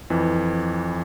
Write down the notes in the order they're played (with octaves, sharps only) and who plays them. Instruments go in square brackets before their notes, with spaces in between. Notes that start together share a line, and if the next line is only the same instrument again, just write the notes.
[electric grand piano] F2 E3